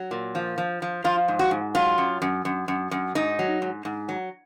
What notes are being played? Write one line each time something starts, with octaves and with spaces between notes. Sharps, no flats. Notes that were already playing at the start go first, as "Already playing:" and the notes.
Already playing: F#3
A#2
F3
F3
F3
F3 F4
G#2
F#4
G#2
F#3 F4
F#2
F#2
F#2
F#2
F#2
G#2 D#4
F#3
G#2
G#2
F#3